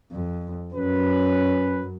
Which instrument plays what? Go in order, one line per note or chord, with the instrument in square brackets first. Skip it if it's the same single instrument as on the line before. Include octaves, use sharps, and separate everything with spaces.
[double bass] F2
[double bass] F#2 [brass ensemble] C#4 B4